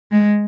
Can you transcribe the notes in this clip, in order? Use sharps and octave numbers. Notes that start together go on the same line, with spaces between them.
G#3